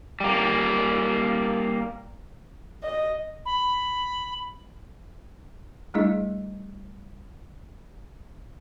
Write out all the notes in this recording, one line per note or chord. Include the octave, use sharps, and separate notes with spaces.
G3 A#3
D#5
B5
G3 A3 D4 E4 G#4 D#5